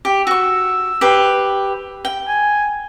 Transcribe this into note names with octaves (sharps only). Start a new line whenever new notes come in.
G4
F#4 C#6 E6
G4 B4 C5
G5
G#5